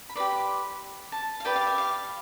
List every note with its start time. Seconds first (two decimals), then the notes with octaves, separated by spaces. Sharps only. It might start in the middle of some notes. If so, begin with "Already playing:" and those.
0.09 B5
0.15 G4 B4 D5 C6
1.12 A5
1.40 F5
1.45 G4 B4 D5 G5
1.56 F5
1.67 E5
1.78 F5